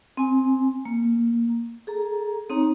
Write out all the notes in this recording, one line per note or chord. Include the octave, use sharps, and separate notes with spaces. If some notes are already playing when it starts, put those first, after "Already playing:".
C4 G#5
A#3
G#4 A4 A#5
C4 D#4 C#5 A#5